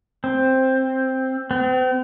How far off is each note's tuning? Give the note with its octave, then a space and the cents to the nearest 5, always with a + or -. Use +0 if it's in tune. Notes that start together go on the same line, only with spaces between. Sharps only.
C4 +5
C4 -40